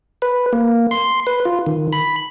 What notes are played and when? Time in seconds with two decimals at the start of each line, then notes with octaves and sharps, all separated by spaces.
0.22 B4
0.53 A#3
0.91 C6
1.27 B4
1.45 F4
1.66 D#3
1.93 B5